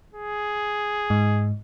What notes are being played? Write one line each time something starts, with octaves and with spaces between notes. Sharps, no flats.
G#4
G#2